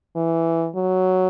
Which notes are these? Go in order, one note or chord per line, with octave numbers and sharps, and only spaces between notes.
E3
F#3